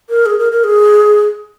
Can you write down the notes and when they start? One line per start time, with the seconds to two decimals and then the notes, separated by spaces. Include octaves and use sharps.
0.09 A#4
0.26 G#4
0.39 A#4
0.52 A#4
0.64 G#4